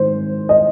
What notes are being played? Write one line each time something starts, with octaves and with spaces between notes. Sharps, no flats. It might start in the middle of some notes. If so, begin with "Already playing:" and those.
Already playing: G#2 D#3 C5
D#5